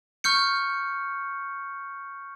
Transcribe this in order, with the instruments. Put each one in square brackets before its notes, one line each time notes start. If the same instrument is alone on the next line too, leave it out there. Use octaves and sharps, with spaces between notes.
[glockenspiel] C#6 F6 G6 C#7